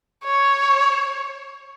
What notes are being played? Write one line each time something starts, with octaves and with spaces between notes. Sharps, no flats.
C#5